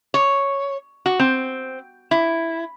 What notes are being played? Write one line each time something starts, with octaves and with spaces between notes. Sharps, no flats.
C#5
F#4
C4
E4